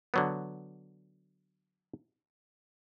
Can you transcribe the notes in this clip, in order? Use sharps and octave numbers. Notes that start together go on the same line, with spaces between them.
D3 F#3 B3